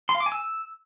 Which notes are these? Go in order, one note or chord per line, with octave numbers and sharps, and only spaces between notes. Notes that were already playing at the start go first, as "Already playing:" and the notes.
C6
F5
D6
G#5
E6